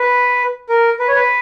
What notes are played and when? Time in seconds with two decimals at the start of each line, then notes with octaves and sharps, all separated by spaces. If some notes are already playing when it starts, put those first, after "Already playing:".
Already playing: B4
0.69 A#4
0.99 B4
1.08 C#5
1.16 B4